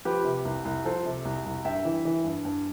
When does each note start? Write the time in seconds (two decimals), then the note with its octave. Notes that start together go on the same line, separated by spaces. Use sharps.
0.05 F3 G4 B4
0.25 C3
0.45 C2
0.65 C2
0.85 F3 A4 C5
1.05 C3
1.25 C2
1.45 C2
1.65 G2 E5 G5
1.85 E3
2.05 E3
2.24 G2
2.45 G2